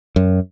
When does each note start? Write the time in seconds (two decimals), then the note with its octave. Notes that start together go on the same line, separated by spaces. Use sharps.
0.16 F#2